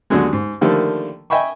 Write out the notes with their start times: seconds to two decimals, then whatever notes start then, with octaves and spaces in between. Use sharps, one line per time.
0.10 D#2 B2 D3 F#3 G#3
0.33 G#2
0.61 D3 D#3 F3 G3 A3 A#3
1.30 D#5 E5 G5 G#5 B5 C#6